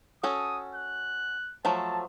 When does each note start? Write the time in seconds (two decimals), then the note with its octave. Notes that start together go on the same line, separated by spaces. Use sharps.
0.23 C#4 F#4 A4 D#6
0.75 F#6
1.65 F3 F#3 A3 A5